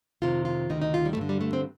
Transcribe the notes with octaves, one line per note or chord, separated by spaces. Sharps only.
F2 C3 D#3 F4
F4
D2 C3 D#3 D#4
D#4
F4
G3
A3
G2 D3 G3
G3
A3
C4